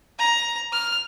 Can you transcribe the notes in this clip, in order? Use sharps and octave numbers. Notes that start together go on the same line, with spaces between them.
A#5
F6